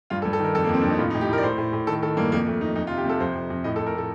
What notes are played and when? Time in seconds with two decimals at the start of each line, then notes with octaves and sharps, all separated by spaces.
0.10 G2 F4
0.22 A4
0.25 G2
0.33 A4
0.40 D#3 A#4
0.55 F2 A4
0.64 A#3
0.69 F2 C4
0.81 F2 D4
0.90 D#4
0.99 A2 F4
1.10 D#4
1.14 A2
1.21 G4
1.29 A2 A#4
1.38 D5
1.43 A2 C5
1.58 A2
1.73 A2
1.87 D#3 A4
2.02 D#3 A4
2.17 G2 A#3
2.32 F2 A#3
2.47 F2 A3
2.61 F2 D#4
2.75 F2 D#4
2.87 F4
2.90 C3
2.98 G4
3.05 C3 A4
3.20 F2 C5
3.35 F2
3.50 F2
3.64 A2 D#5
3.76 A4
3.79 A2
3.86 A#4
3.94 A2 A4